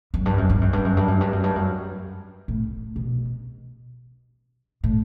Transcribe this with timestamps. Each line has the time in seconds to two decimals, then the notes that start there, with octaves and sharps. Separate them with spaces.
0.14 F#2
0.26 G2
0.38 F#2
0.50 G2
0.61 F#2
0.73 G2
0.85 F#2
0.97 G2
1.08 F#2
1.21 G2
1.33 F#2
1.44 G2
1.56 F#2
2.48 A2
2.96 B2
4.84 A2